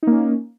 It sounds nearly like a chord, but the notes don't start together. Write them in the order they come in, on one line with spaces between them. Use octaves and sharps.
D#4 A#3 C#4